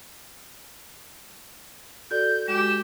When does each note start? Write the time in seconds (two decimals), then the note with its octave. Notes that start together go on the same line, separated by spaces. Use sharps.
2.11 F#4 A4 D5 G6
2.48 G#3 F#4 G4 E7